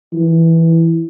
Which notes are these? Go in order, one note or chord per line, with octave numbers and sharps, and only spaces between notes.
E3